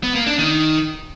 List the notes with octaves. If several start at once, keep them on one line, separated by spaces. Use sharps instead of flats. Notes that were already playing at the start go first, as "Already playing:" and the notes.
B3
A#3
D4
D#3